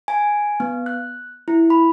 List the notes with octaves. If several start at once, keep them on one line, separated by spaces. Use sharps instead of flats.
G#5
B3
F#6
E4
B5